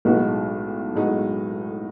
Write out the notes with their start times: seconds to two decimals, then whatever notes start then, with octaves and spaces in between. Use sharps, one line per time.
0.05 B1 A2 G#3 D#4 F#4
0.95 A2 G#3 D#4 F#4